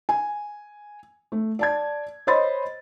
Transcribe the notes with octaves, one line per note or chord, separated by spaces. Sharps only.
G#5
A3
D5 A5 G#6
C5 C#5 D#5 B5 C6 A6